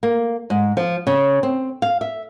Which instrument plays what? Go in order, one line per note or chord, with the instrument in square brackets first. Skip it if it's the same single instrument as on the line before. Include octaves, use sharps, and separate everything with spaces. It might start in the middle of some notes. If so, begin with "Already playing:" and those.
[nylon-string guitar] A#3
G#2
F3
C#3
C4
F5
E5